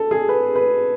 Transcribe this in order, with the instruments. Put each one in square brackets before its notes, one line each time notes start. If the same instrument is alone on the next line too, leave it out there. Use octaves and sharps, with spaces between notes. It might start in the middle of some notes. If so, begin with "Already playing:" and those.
Already playing: [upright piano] A4
G#4
B4
B4